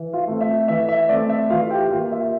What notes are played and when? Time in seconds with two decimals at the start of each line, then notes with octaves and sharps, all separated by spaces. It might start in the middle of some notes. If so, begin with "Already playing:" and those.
Already playing: E3
0.13 F4 F5
0.28 A3 C4
0.41 E5
0.68 E3 E5
0.89 E5
1.09 A3 C4 D5
1.29 E5
1.50 E3 F4 F5
1.70 G4 G5
1.91 A#3 F4 F5
2.12 E5